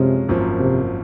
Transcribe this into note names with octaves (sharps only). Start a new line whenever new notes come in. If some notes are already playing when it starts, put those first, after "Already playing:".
Already playing: F#2 C3 F3 G#3 C#4
G#1 F#2 F3 A#3
C3